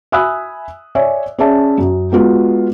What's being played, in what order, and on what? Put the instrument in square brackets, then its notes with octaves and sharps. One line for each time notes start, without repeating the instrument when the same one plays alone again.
[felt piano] E5 G#5 B5 D#6 E6 F#6
C#5 D5 E5 G#5
C#4 G#4 C#5 D5 E5 A5
F#2
G#3 B3 F4 F#4